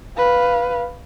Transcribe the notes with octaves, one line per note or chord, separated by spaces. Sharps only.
B4 F5